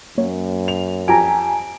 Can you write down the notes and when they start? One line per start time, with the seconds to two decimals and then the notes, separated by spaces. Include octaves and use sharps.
0.18 F#2 A#3 C#5
0.68 F7
1.08 F2 G4 G#5 A#5 D7